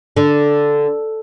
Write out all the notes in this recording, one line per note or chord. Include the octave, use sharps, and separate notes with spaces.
D3